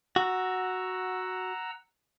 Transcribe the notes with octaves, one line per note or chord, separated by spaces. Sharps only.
F#4 F#5 A#5 E6